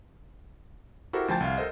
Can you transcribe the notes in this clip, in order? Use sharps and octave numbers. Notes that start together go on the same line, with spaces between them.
E4 F#4 G4 A4 A#4 C5
D2 F3 C5 G5 A5 A6
C2 F5
A4 A#4 C5 D#5